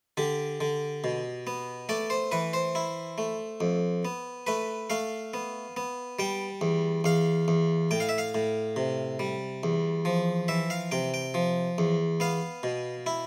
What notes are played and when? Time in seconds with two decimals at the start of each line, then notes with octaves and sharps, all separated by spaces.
0.17 D3 G4
0.61 D3
1.04 B2
1.47 B3
1.89 A3 D5
2.10 C5
2.32 E3 B4
2.53 C5
2.75 E4
3.18 A3
3.61 F2
4.05 B3
4.47 A3 B4
4.90 A3 F5
5.34 B3
5.77 B3
6.19 G3 G5
6.61 E2
7.04 E2 F5
7.48 E2
7.91 A2 G5
8.00 F5
8.09 E5
8.18 F5
8.35 A2
8.76 C3
9.19 G3
9.63 E2
10.05 F3
10.48 E3 E5
10.70 F5
10.91 C3 G5
11.14 G5
11.34 F3
11.78 E2
12.20 B3 F5
12.63 B2
13.06 E4